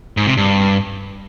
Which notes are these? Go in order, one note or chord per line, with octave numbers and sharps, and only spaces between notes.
G#2
C3
G2